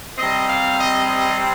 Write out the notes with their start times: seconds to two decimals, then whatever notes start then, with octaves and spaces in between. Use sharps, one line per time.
0.18 C3 G3 C4 D#5
0.49 F5
0.80 D#5
1.10 D#5